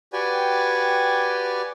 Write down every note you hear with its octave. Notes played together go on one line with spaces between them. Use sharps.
F#4 G4 B4 D5 G5 G#5